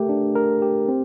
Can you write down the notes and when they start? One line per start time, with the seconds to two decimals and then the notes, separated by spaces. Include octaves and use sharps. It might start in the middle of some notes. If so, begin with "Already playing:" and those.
Already playing: A3 G4 A#4
0.09 D4
0.35 A#4
0.62 G4
0.88 C4